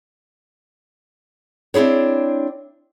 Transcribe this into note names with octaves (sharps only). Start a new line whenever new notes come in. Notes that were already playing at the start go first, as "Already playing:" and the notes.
C4 D4 E4 G#4 C#5